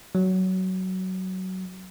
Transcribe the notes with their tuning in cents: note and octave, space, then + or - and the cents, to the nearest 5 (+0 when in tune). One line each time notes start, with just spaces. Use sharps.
F#3 +15